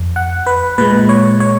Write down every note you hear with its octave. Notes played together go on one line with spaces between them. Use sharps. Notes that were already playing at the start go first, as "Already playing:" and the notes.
Already playing: F2
F#5
B4
A#2 G#3 B4
C#5
C#5